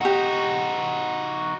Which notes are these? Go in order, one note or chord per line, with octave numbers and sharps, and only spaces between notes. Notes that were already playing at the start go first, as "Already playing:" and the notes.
D#4 F#4 G4 F#5